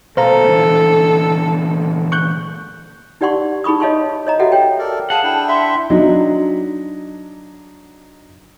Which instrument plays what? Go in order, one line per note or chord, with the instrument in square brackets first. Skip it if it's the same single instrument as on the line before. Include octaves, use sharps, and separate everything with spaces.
[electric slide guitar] B2 A3 [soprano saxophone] A4 [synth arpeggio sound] C5 F5 A#5
[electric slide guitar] A#2 D3 E3
[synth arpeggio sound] C#6 F#6 G6
[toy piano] D#4 G4 D5 F#5 C6 C#6
D#4 G#4 B5 C#6 D#6
C#5 D#5 F5 A5 C6 C#6
C#5 D#5 A#5
F#4 G4 A4 D#5 E5 F#5
C#5 G5
[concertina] A4 A#4 D5
[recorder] G#4 [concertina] F5 [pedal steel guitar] F#5 [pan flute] A5
[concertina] D4 E4 G5
[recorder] E5 [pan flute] C6
[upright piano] F#3 D4 D#4